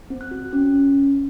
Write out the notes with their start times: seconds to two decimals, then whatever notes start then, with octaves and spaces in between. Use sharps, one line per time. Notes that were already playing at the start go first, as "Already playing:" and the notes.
0.10 C4
0.21 F#6
0.31 F#4
0.53 C#4
0.74 C#4